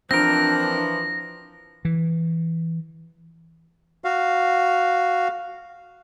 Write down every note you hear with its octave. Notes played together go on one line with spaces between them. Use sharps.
E3 F3 C4 D4 A#4 A#6
E3
F#4 F5